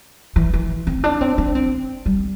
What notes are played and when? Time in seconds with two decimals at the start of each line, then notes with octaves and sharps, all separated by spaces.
0.36 E3
0.53 E3
0.87 C4
1.04 D4
1.21 C4
1.38 D4
1.55 C4
2.06 G3